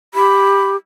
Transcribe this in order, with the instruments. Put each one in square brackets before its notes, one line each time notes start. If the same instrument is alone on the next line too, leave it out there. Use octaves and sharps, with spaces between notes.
[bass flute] G4 [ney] B5